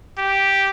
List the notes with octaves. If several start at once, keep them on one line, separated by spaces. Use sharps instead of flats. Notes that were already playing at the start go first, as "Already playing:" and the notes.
G4